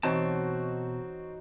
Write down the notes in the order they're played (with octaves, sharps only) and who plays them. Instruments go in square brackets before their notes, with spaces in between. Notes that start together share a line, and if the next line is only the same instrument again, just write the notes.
[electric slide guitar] B2 A5 [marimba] E3 [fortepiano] C4 [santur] D#4 F#4 C#5